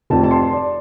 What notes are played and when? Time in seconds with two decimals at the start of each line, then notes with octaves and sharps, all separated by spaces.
0.10 F1 F2 C3 A5
0.24 A5
0.31 C6
0.53 D5